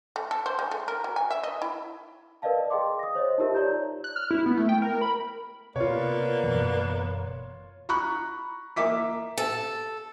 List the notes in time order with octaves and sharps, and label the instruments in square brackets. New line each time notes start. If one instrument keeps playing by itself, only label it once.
[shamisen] A3
A4
C5
G#3
A3
A#4
F#3
G#5
E5
D#5
E4
[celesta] A#4 B4 D5 D#5 F5 A5
G#4 D#5 G5 C6 D6
D#6 A#6
C5 C#5 D#5
D#4 F4 G4 A#4 E5 A5
C#5 D5 A#5 G6
[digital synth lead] F#6
F6
E4
B3
A3
G5
A#4
B5
[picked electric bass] C3 [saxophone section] A#3 B3 D5 [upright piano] F4 C#5
[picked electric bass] F#1 B2 E3
[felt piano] A#5 B5 C#6 F#6
A#3 E5 D6 B6
[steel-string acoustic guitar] A4